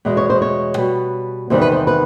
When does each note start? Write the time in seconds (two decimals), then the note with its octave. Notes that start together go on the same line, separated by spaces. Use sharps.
0.05 E2 B2 G#3
0.17 C#5
0.30 C5
0.42 C#5
0.78 B2 G3 B3
1.50 E2 C3 D#3 G3 B3 C5
1.61 B4
1.72 C5
1.87 B4